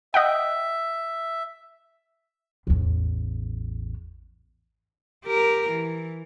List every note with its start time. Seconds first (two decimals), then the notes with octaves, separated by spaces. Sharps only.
0.14 D#5 E5 F#5 G5
2.67 A1 E2
5.25 G4 A#4
5.69 E3